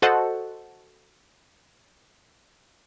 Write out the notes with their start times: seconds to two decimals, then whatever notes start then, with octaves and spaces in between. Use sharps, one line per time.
0.02 F#4 A4 C5 D#5 F#5